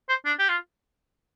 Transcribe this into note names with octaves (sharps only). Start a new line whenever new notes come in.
C5
D4
G4
F4